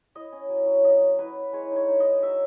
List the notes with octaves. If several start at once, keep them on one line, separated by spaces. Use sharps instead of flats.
E4 D#5
C#4
F#3
F#3
F#3 D#5
F#3
E4 B4
E4
G#3 C#5
D#4 C#5
D#4
D#5
D#4
F#3 E5